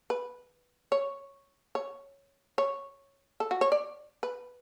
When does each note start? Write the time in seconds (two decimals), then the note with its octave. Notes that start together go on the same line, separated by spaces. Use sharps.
0.10 B4
0.92 C#5
1.75 C#5
2.58 C#5
3.40 A4
3.51 F#4
3.61 C#5
3.72 D5
4.23 B4